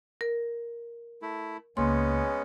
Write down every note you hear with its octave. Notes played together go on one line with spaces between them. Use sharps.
A#4
A3 E4
C#2 G#3 A#3 B3 C#4 C6